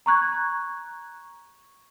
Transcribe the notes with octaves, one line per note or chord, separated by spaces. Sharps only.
A#5 C#6 F#6 G#6